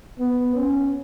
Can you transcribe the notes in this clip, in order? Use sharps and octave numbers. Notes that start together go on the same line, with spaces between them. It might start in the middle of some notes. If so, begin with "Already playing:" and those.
B3
C#4